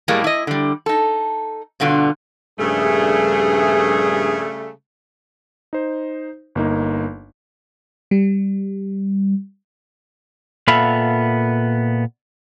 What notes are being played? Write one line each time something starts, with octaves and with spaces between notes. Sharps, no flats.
A2 G3 G#3 A#3
E4 D#5
D3 G3
D#4 A4
G2 B2 D3 F4
A#1 G2 C#3 G3 A3 G#4
D#4 C5
G1 A#3 D#4
G3
A#2 B3 A4 E5 F5 B5